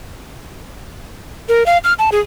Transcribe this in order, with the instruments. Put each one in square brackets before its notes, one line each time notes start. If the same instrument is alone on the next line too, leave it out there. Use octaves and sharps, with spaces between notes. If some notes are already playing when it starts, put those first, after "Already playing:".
[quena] A#4
F5
F6
A5
G#4